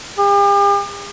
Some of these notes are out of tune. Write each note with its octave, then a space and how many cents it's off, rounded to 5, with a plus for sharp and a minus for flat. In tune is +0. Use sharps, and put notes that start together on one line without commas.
G4 +45